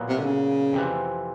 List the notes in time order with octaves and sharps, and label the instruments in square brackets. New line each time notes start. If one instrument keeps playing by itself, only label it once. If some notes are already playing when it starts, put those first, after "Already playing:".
Already playing: [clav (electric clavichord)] A#2 F#3 B3 E4
[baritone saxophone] C3
D3
C#3
[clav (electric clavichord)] F2 C3 E3